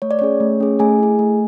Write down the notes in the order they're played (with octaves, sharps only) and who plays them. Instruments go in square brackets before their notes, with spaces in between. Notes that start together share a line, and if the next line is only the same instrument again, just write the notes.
[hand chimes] A3 C#5
D5
C#4 G#4 C#5
A3
C#4 G#4
A3 G#4 G#5
E4 G#4
A3